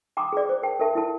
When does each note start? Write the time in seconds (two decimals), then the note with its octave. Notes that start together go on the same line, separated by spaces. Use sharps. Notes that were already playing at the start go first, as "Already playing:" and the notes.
0.17 G5 G#5 A#5 C6 D6 D#6
0.33 G#4 D5
0.49 C5
0.63 A#4 G5 A5
0.80 A4 A#4 E5 A5
0.95 E4 A4 A5